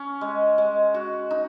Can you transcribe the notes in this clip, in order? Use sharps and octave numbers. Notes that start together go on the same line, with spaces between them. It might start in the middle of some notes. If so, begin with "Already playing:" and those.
Already playing: C#4
G#3
G#3
F#4
D#4